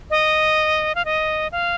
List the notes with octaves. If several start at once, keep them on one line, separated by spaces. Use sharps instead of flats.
D#5
F5
D#5
F5